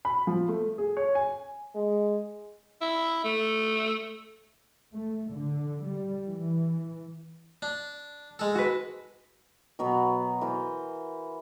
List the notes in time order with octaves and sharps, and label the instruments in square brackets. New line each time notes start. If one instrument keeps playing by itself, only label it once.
[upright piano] B5
F3
A3
G#4
C#5
G#5
[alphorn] G#3
[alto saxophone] E4
A3
[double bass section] A3
D3
G3
E3
[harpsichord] D4
G#3 A4
[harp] F#4 B4
[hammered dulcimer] B2 F#3 B3
E3 A#4 C5